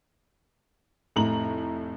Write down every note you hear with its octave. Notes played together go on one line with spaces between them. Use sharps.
F1 A2 A#5 F#7